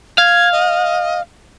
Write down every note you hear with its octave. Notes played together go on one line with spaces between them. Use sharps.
F5 G#6
D#5